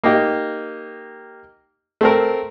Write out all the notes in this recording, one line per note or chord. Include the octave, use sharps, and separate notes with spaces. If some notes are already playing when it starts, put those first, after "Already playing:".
A#3 D#4 G4
A3 C4 A#4